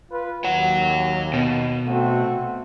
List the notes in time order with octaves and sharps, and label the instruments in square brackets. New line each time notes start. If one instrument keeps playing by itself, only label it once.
[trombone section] F4 B4
[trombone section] D#2 [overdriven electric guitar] C#5 F#5
[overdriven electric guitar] B2
[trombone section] A3 C4 F#4